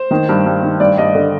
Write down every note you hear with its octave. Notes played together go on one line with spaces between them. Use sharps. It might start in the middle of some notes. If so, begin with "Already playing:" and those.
Already playing: C5
D#3
G2
G2
D#3
G2 D5
G2 D#5
D3